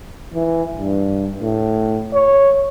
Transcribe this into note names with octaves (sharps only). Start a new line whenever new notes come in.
E3
G2
A2
C#5